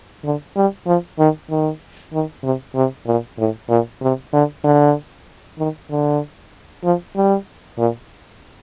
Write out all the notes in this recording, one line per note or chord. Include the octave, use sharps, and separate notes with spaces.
D3
G3
F3
D#3
D#3
D#3
C3
C3
A#2
A2
A#2
C3
D3
D3
D#3
D3
F3
G3
A#2